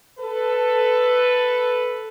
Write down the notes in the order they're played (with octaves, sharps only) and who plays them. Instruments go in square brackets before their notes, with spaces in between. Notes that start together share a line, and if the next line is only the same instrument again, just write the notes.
[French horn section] A4 B4